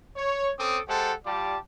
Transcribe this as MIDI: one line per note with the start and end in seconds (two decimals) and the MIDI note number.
0.17 0.51 73
0.58 0.80 60
0.58 0.80 61
0.58 0.80 69
0.58 0.80 86
0.58 0.80 87
0.88 1.12 56
0.88 1.12 67
0.88 1.12 69
0.88 1.12 72
0.88 1.12 78
0.88 1.12 81
1.26 1.57 55
1.26 1.57 65
1.26 1.57 67
1.26 1.57 74
1.26 1.57 81
1.26 1.57 86